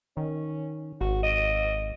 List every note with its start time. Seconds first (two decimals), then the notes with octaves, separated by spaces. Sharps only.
0.17 D#3 C#4
1.01 G#1 F#4
1.23 D#5